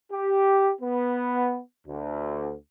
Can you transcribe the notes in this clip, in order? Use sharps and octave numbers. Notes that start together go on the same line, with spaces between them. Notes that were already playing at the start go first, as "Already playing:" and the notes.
G4
B3
D2